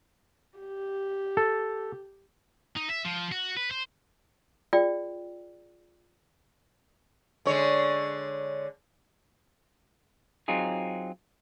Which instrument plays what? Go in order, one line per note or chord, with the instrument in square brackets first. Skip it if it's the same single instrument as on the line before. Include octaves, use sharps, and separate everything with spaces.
[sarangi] G4
[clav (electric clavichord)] A4
[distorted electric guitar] D#4
E5
F3
F#4
B4
C5
[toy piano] F4 G#4 D5 G5
[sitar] D3 G#3 C#5
[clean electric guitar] F#3 C4 D#4 F4 G#4